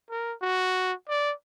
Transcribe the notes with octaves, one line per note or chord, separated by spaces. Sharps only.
A#4
F#4
D5